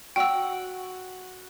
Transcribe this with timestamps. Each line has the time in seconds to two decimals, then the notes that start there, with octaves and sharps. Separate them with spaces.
0.16 F#4 F#5 G5 E6